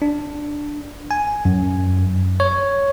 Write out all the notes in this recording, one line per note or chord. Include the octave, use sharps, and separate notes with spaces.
D4
G#5
F#2
C#5